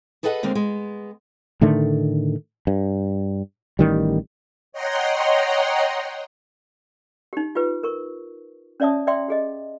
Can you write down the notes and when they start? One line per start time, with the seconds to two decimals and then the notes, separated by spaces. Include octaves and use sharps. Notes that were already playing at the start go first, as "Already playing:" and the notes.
0.23 G#4 A4 B4 D#5 F5 F#5
0.43 D#2 D3 G#3 A#3 C4
0.55 G#3 B3
1.61 A2 D3 D#3 A3
2.67 G2
3.79 A1 D#3 G3
4.72 C#5 D#5 F#5 G5 A#5 C6
7.33 D#4 G4
7.55 F4 G4 B4
7.83 A#4 C#6
8.80 C#4 C#5 D5 E5 A5 D#6
9.07 D5 E5 G5 C6
9.28 G4 G#4 D#5